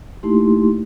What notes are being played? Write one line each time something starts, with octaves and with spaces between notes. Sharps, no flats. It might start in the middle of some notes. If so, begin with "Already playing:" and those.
A3 A#3 D#4 E4 G4 C6